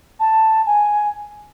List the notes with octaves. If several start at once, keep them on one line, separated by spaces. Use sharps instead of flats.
A5
G#5